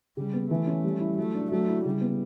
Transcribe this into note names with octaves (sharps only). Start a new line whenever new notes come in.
C#3 G3
B3
E3 A3
C#4
G3
E4
F#3 A3
D4
F#3 A3
E4
C#3 G3
B3